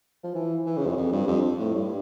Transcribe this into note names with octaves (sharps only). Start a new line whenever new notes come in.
F3
E3
E3
C#3
F2
F2
G2
F2
A2
G2